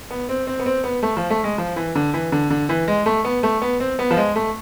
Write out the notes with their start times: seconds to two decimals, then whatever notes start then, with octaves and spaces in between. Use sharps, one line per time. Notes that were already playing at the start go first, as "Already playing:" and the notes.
0.11 B3
0.29 C4
0.47 C4
0.59 B3
0.66 C4
0.84 B3
1.03 A3
1.17 F3
1.30 A3
1.44 G#3
1.58 F3
1.76 E3
1.95 D3
2.14 E3
2.32 D3
2.50 D3
2.69 E3
2.88 G#3
3.06 A3
3.25 B3
3.43 A3
3.62 B3
3.80 C4
3.99 B3
4.11 F3
4.17 G#3
4.36 A3